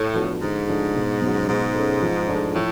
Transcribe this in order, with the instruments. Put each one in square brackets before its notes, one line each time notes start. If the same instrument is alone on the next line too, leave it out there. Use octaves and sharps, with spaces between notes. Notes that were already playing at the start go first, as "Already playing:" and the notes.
Already playing: [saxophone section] A2
[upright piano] F3 B3 D4 F#4
[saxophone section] G#2 [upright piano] D3
[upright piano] F3 A3 D4
B2
F#3 C#4 F#4
[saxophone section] G#2 [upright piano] B2
[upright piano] A3 C#4
F3
A3 D4 F4
[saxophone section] A2 [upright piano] F3